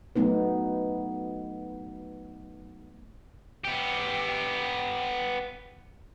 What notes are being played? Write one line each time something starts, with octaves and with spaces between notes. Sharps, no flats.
F#3 A3 B3 D#4 B4
B3 G4